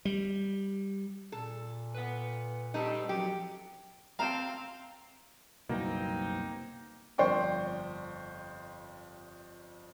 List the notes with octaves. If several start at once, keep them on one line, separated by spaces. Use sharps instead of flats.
G3
A#2 A4
B4 F#5
G3 D#4 G4 A4 B4
F2 F#3 G4
C4 F5 G5 A5 A#5
F#1 C2 B2 A#3 C4 D#4
G1 F2 C5 D5 G5 C#6